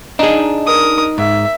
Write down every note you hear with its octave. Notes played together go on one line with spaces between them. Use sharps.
D4 D#4 G#4
A#4 D#6
G#2 E5